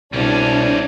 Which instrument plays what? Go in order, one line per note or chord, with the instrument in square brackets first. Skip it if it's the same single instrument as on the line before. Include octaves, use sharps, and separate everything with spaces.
[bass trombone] C2 [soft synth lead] B2 [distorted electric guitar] G3 C#4 [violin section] D4